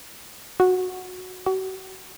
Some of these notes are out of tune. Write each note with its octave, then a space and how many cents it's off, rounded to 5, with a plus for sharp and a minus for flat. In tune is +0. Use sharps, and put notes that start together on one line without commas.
F#4 -10
F#4 +40